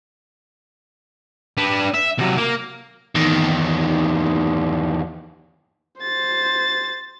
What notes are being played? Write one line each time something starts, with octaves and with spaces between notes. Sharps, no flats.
D4 B4
E5
C3 F#3
A#3
E2 D#3
C5 A6